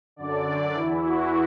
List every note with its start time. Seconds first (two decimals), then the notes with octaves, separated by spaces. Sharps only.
0.16 F#2 D3 D5
0.74 E2 E3 E4
1.04 F#4